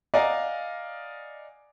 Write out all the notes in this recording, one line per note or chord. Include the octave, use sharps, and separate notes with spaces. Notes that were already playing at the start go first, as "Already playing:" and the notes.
D5 D#5 F5 F#5 G#5 A#5